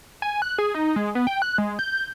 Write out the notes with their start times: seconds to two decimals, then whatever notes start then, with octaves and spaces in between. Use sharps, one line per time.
0.22 G#5
0.42 F#6
0.58 G#4
0.74 D#4
0.96 G#3
1.15 B3
1.27 G5
1.42 F#6
1.58 G#3
1.79 G6